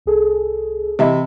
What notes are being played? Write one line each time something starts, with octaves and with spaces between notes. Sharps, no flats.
C2 G#4 A4
C3 E3 D#5 E5 B5